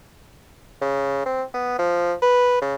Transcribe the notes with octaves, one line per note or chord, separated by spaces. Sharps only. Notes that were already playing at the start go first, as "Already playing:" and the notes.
C#3
C4
B3
F3
B4
C#3